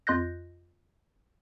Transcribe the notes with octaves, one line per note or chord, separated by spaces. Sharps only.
F2 F4 D#5 F#6 G6 A#6